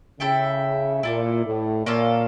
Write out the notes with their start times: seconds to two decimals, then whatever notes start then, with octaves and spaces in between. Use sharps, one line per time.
0.20 C#3 E4 A4 E5 G5
1.03 A#2 E4 A4 D5
1.45 A2
1.86 A#2 A#3 C#4 F4 A4